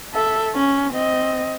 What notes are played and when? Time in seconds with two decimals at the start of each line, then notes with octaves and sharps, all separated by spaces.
0.14 A4 E5
0.55 C#4
0.94 C4 D#5